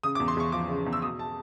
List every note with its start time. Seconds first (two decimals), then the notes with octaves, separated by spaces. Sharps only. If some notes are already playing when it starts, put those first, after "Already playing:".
0.03 C#3 D#6
0.15 D6
0.20 E2
0.28 C6
0.37 E2 C#6
0.52 F3 D6
0.69 C#3
0.86 E2
0.93 E6
1.02 B2 D#6
1.19 A5